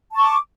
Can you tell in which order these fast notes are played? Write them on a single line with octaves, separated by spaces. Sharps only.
A5 C#6 D6